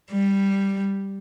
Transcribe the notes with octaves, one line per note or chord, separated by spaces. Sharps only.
G3